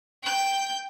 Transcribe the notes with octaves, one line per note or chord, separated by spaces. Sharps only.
G5 G6